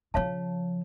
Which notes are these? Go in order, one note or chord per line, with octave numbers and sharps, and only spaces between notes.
C#3 F3 C#5 F5 A5